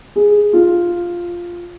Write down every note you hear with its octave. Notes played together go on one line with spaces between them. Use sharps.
G#4
F4